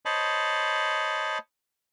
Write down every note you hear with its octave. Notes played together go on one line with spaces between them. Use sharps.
C5 C#5 D#5 A5 B5